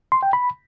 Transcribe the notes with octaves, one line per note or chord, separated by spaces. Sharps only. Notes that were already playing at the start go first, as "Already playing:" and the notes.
C6
G5
B5